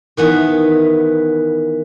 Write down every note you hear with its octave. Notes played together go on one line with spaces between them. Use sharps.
D#3 E3 B3